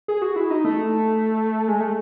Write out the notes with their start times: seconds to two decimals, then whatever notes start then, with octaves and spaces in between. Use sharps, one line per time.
0.08 G#4
0.22 F#4
0.36 E4
0.51 D#4
0.65 A3
1.68 G#3
1.80 A3